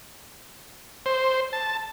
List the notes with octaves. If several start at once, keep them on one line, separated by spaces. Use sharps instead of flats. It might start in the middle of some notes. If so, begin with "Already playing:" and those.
C5
A5